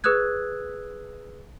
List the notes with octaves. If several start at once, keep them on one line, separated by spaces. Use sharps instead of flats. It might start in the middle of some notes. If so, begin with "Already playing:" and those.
G#4 B4 D#6 E6 F#6 G#6